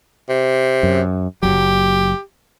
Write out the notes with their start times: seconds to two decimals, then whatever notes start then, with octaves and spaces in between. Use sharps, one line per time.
0.29 C3
0.83 F#2
1.43 F#1 D#2 F#3 G4